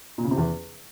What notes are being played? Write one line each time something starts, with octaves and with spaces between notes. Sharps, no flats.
A#2
C#3
C3
E2